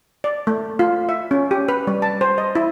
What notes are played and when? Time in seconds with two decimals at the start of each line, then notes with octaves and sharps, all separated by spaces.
0.24 D5
0.47 A3
0.79 F4
1.09 E5
1.31 C#4
1.51 G4
1.68 B4
1.87 G3
2.02 A5
2.21 C5
2.38 D#5
2.55 E4